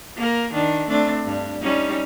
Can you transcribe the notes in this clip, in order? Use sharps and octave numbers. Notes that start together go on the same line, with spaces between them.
A#3 A#4
D#3 D4
A3 C4 D4
G2
G3 C#4 D#4